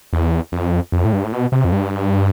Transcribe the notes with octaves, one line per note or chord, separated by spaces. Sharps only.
E2
F2
F2
A2
G2
A2
B2
C3
F2
G2